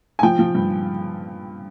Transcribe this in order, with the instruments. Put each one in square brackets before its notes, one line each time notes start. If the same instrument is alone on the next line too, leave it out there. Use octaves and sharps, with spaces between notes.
[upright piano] G#5
F3 G5
F3
G2